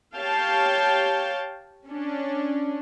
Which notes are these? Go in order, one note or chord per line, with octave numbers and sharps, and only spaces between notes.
G4 C#5 F5 G5 A5
C#4 D4